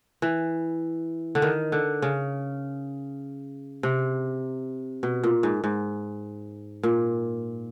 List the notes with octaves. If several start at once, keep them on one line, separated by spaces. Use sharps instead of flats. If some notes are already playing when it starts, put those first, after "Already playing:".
E3
D3
D#3
D3
C#3
C3
B2
A#2
G#2
G#2
A#2